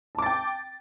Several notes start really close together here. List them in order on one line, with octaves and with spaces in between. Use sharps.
A5 D6 A6 G5